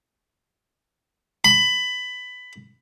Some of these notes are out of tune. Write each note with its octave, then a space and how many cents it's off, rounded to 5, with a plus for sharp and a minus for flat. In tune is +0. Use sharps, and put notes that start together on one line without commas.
B5 +15